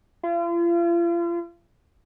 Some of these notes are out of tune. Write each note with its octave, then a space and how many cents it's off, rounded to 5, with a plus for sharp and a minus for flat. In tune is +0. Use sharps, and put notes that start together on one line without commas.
F4 -40